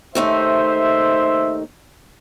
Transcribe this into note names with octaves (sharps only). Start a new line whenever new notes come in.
D#2 A3 D#4 C5 E5